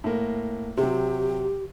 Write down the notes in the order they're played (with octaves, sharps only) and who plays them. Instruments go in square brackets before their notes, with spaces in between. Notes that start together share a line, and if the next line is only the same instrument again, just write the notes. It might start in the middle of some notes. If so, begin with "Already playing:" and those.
[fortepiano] A2 A#3
[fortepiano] C3 F#3 [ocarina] G4